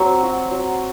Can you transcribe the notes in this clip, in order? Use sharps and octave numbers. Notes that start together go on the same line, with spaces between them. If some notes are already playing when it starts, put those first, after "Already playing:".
Already playing: F#3 C4
F#4
F#3